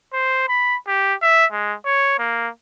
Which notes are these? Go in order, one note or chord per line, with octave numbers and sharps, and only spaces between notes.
C5
B5
G4
E5
G#3
C#5
A#3